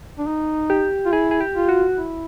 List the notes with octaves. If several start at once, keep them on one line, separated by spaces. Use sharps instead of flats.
D4
D#4
G4
F4
E4 G#4
G#4
G4
F4
F#4
E4